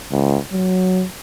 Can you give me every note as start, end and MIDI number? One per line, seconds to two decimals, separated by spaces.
0.11 0.38 37
0.53 1.04 54